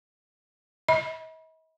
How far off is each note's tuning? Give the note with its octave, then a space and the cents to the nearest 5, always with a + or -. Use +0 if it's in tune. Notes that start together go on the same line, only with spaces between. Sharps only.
D#5 +45 B5 -30